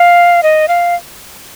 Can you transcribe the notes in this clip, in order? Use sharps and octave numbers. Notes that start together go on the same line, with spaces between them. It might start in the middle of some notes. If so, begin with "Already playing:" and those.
Already playing: F5
D#5
F5